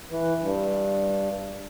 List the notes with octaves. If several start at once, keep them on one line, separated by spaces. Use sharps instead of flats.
E3
G2